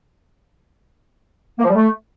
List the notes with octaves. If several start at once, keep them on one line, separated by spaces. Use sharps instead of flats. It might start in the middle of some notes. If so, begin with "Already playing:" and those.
A#3
F3
G3
A3